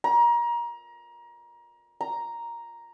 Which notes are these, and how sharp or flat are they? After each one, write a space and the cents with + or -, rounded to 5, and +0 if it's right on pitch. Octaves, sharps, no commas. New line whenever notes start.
A#5 +25
A#5 +5